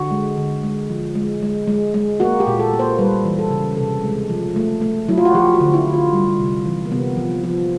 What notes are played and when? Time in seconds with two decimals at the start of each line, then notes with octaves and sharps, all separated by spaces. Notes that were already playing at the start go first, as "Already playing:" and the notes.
Already playing: D3 F#4
0.11 G#3
0.37 D3
0.63 G#3
0.90 F3
1.15 G#3
1.43 G#3
1.68 G#3
1.94 G#3
2.20 A#3 F#4
2.40 G4
2.47 A#2
2.59 A4
2.73 A#3
2.79 C5
2.99 G3 B4
3.25 E3
3.39 A4
3.51 C#3
3.77 C3 A4
4.04 G#3
4.30 F3
4.56 A3
4.82 A3
5.08 F#3 E4
5.18 F4
5.25 F#4
5.34 F3 G4
5.55 F#4
5.61 D3
5.74 E4
5.86 D3
5.93 F4
6.13 G3
6.39 C3
6.65 E3
6.85 A#3
6.92 C3 B3
7.17 F3
7.44 F3